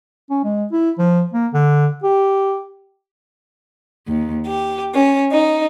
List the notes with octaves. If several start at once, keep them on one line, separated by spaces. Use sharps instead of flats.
C#4
G#3
E4
F3
A#3
D3
G4
D#2
G4
C#4
D#4